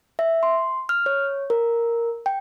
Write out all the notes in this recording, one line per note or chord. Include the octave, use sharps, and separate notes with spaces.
E5
C6
F6
C#5
A#4
G5